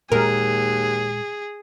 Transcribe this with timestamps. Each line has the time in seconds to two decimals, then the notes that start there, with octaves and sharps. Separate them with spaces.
0.12 D#2 A#2 G#3 G#4 A#4